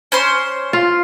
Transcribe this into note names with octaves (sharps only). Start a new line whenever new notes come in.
C#4 C5 C6
F4